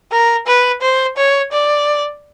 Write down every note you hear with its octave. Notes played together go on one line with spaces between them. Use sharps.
A#4
B4
C5
C#5
D5